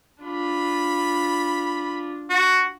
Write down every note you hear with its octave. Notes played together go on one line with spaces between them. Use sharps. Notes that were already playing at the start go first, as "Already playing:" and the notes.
D4 F4 B5
F#4